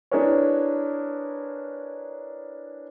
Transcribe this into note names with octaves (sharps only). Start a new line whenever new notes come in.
D4 E4 G#4 A#4 B4 C#5